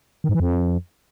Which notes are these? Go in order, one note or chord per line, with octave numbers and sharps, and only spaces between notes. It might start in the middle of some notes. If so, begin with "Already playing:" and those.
D#3
G#2
E3
F2